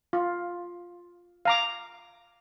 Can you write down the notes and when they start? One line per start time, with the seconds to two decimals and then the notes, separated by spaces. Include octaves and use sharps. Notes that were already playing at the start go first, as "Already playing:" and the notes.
0.13 F4
1.45 F5 A#5 D6